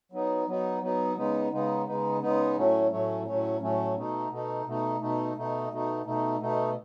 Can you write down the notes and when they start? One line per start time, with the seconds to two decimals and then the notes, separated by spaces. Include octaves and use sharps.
0.12 F#3 B3 D#4
0.47 F#3 B3 D#4
0.81 F#3 B3 D#4
1.16 C#3 G#3 B3 D#4
1.51 C#3 G#3 B3 D#4
1.86 C#3 G#3 B3 D#4
2.22 C#3 G#3 B3 D#4
2.55 A2 F#3 A3 C#4
2.91 A2 F#3 A3 C#4
3.25 A2 F#3 A3 C#4
3.61 A2 F#3 A3 C#4
3.95 B2 A3 D#4
4.30 B2 A3 D#4
4.65 B2 A3 D#4
5.00 B2 A3 D#4
5.35 B2 A3 D#4
5.70 B2 A3 D#4
6.05 B2 A3 D#4
6.40 B2 A3 D#4